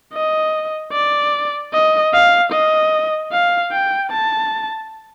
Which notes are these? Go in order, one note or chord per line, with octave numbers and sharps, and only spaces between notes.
D#5
D5
D#5
F5
D#5
F5
G5
A5